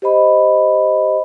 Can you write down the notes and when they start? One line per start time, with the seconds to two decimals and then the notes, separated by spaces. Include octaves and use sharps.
0.02 G4 C5 D#5 B5